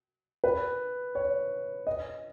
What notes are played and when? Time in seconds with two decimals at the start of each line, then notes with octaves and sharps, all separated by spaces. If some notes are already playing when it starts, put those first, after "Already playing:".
0.44 B4
1.15 C#5
1.87 D#5